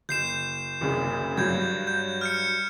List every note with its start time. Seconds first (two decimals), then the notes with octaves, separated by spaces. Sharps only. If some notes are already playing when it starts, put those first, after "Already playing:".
0.09 F#1 G6 C7 E7
0.81 F#1 C2 C#3
1.37 G2 F#3 G6 G#6
1.87 G6
2.21 F6 G6 C#7